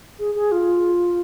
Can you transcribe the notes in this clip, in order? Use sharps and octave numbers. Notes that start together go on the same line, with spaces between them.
G#4
G#4
F4